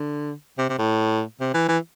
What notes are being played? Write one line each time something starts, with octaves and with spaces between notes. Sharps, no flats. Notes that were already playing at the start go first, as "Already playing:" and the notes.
Already playing: D3
C3
C3
A2
C3
E3
E3